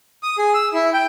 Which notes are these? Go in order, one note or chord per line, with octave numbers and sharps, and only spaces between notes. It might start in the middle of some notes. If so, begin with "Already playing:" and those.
D#6
G#4
E6
E4
G5